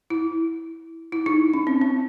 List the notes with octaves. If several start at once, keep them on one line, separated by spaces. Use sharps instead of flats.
E4
E4
D#4
C#4
C4
C4